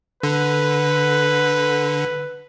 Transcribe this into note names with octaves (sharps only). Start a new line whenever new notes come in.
D3 B4